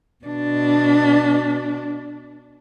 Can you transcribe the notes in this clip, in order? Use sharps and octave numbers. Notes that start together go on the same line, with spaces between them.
B2 D4